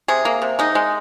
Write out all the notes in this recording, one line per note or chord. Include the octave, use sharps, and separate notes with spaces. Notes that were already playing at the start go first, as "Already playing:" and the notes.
C3 G#4
A#3
C3
G#3 D#4
G#3